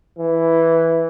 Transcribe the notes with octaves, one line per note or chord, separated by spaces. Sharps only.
E3